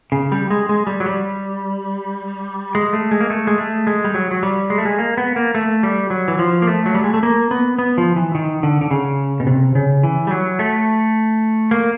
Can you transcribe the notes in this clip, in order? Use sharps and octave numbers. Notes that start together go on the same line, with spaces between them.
C#3
G3
G#3
G#3
G3
F#3
G3
G#3
A3
G#3
A#3
A3
G#3
A3
G#3
G3
F#3
F#3
G3
G#3
A3
G#3
A#3
B3
A#3
A3
G3
F#3
E3
F3
A#3
A3
F#3
G3
G#3
A3
A#3
B3
B3
F3
E3
D#3
D3
D3
C#3
B2
C3
C#3
E3
G3
F#3
A3
A#3